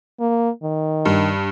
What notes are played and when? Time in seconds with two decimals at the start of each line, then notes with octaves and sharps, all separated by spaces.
0.20 A#3
0.63 D#3
1.05 G2